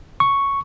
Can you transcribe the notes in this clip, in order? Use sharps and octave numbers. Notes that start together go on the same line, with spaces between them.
C#6